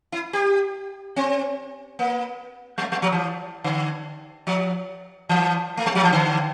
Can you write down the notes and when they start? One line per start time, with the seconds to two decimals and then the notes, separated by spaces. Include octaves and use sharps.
0.12 E4
0.33 G4
1.16 C4
1.99 A#3
2.78 G3
2.82 A3
2.92 G3
3.02 F3
3.12 E3
3.64 D3
4.47 F3
5.29 E3
5.77 A3
5.86 G3
5.95 F3
6.03 E3
6.13 D3